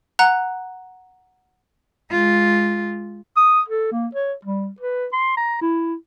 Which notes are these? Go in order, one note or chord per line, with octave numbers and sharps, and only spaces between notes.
F#5 A#5 F#6
G#3 F4
D#6
A4
A#3
C#5
G3
B4
C6
A#5
E4